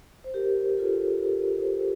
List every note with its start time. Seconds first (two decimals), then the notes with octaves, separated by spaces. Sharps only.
0.24 C5
0.34 G4 A#4
0.78 F4 A4
1.23 G4 A#4
1.62 C5
1.68 G4 A#4